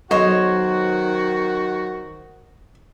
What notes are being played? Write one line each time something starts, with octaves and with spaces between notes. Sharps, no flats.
B1 D#3 F#4 C5 C#5 D#5